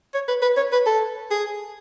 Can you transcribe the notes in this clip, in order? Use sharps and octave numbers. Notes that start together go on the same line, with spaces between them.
C#5
B4
B4
C#5
B4
A4
G#4